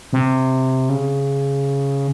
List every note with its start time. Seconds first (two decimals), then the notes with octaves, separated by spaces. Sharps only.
0.13 C3
0.89 C#3